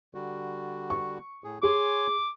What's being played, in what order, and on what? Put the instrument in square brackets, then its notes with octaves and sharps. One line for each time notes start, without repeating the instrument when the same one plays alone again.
[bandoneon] D3 G3 F#4
[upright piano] C#6
[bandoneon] A2 G#4
[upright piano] G#4 [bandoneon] C#5 G#5 C6 [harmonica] D6